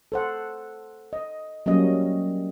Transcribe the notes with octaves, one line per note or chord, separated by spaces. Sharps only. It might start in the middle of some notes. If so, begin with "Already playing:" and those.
A4 C5 F#5
D#5
F#3 G3 A#3 C#4 D#5